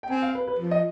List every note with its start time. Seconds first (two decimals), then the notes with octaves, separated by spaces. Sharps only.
0.03 G5
0.10 C4 G#5
0.22 F5
0.35 B4
0.47 B4
0.59 F3
0.71 D#5